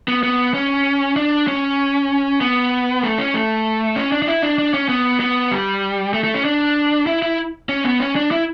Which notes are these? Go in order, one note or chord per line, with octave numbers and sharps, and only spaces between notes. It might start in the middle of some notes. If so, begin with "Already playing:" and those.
B3
B3
C#4
D4
C#4
B3
A3
C#4
A3
C#4
D4
D4
E4
D4
D4
C#4
B3
B3
G3
A3
A3
C#4
D4
E4
E4
C#4
B3
C#4
D4
E4